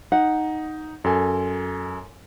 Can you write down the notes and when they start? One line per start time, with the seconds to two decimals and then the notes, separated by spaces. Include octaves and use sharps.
0.12 D#4 F#5
1.04 F#2 A4 G#5